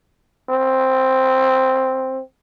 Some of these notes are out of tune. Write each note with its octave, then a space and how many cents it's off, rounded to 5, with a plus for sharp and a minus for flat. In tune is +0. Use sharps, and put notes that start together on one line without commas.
C4 +5